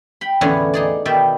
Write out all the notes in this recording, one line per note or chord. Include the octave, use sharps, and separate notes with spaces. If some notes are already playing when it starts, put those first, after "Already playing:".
G5 B5
E2 A2 D3 B3 C#4 G#5
D#4 G#4 D5
B2 D#3 D5 E5 G5